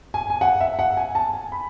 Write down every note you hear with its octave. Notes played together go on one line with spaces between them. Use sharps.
G#5
G#5
F#5
E5
F#5
G#5
A5
G#5
B5